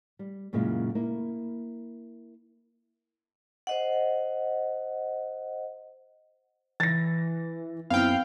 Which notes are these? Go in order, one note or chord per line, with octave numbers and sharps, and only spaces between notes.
G3
F#2 A#2 C#3 G#3 E4
A#3 E4
C5 D#5 F#5
E3 A6 A#6
F#2 B3 C4 E4 F5 G5